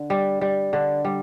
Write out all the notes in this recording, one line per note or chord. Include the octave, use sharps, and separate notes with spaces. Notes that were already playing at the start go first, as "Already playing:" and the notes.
Already playing: D3
G3
G3
D3
G3